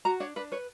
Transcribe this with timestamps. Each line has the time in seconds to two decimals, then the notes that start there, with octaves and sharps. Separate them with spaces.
0.05 F#4 A#5
0.20 D4 C#5
0.36 D4 B4
0.52 B4 C#5